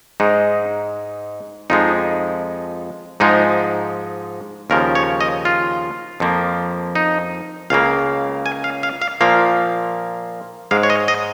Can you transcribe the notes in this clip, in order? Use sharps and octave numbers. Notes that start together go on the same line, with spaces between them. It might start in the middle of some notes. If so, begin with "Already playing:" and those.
G#2 G#3 D#4
F2 F3 G#3 D#4
G#2 F3 G#3 D#4
D#2 C#3 F3 A#4
C#5
D#5
F4
F2 F3 A#3
D#4
C#2 C#3 A#3 F5
G#5
F5
F5
F5
A#2 F3 A#3 F5
G#2 G#3 F5
C#5
D#5
D#5